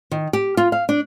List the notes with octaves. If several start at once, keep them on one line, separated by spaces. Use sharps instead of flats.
D#3
G4
F4
F5
D4